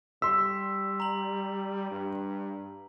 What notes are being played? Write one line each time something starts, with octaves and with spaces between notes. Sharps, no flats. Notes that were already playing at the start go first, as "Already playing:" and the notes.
G3 C6 E6 B6
A#5 F#7
G2